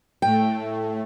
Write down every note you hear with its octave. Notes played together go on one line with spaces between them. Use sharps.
A2 A3 G5